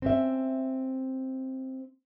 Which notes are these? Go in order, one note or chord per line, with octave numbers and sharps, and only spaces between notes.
C4 C#4 E5